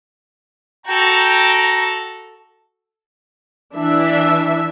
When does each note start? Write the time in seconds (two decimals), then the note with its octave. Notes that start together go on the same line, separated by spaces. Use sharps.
0.87 F#4 A4 G5 A#5
3.75 E3 D4 E5